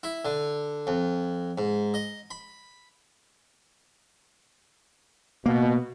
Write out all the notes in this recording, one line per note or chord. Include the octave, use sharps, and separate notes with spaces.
E4
D3
F2
G#2
D#5
B5
B2 A#3